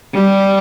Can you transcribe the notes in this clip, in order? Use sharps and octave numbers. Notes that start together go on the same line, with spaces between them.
G3